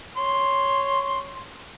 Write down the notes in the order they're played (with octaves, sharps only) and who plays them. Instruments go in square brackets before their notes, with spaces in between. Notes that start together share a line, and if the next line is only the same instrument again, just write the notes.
[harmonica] C#5 C6